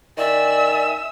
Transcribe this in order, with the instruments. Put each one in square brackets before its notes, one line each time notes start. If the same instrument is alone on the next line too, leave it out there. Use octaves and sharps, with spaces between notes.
[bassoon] D#3 [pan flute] D5 [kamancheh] E5 E6 [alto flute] G#5